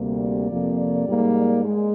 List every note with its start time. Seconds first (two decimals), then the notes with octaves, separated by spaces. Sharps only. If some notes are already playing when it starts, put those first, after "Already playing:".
Already playing: D2 C3 G3 A#3
0.20 D5
0.48 F2 C3 F3 A#3
0.77 D5
1.07 G#2 G3 A#3
1.36 D5
1.64 G#3